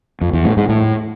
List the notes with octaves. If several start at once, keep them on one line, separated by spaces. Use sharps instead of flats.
F2
E2
A2
G#2
A2